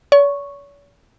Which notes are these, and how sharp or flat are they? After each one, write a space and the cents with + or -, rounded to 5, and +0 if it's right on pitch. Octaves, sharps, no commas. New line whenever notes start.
C#5 +45 C#6 +0